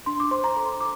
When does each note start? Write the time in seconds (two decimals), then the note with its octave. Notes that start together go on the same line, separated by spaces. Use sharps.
0.06 D4 C6
0.20 D6
0.31 C5 C6
0.44 A#5
0.56 A4 C6
0.80 D6